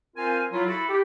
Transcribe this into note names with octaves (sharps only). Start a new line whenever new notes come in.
C4 F4 A#4 C5 F5 G#5
F#3 E4 F4
E4 F#4 A4 B5
G4